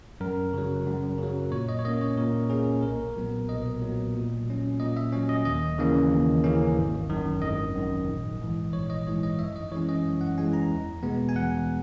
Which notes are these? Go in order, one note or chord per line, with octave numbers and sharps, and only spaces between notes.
F#2 A#4
C#3 F#3
F#2
C#3 F#3
A#2 C#5
D#5
C#5
A#3 C#4 D#5
C#5
A#2 A#4
A#3 C#4 G#4
B1 A#4
A#2 F#3 B3
B1 D#5
A#2 F#3 B3
A#2
F#3 C#4
A#2 D#5
E5
F#3 C#4 C#5
D#5
D#2 D#5
C#3 E3 A#3 C#4
D#2
C#3 E3 A#3 C#4
G#1
F#2 D#3
G#1 D#5
F#2 D#3
A#1
G#2 E3
A#1 C#5
D#5
G#2 E3 C#5
D#5
F#2 E5
D#5
E3 G#3 C#4 C#5
D#5
F#2
F#5
E3 G#3 C#4 G#5
A#5
E2
B2 G#3 B3
G#5
E2 F#5